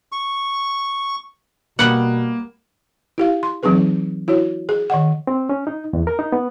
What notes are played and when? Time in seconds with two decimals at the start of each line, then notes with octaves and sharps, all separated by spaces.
0.12 C#6
1.79 B2 G3 A#3 B3 F#5
3.18 E4 G4 F5
3.43 C6
3.63 E3 F#3 C4 D#4 G#4 B4
4.28 E4 F#4 C#5
4.69 G#4
4.90 D#3 D#5 F#5
5.27 C4
5.49 C#4
5.67 D#4
5.93 E2
6.07 A#4
6.19 D#4
6.32 B3